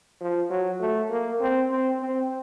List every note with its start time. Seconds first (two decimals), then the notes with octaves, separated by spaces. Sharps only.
0.21 F3
0.50 F#3
0.81 A3
1.10 A#3
1.41 C4
1.71 C4
2.00 C4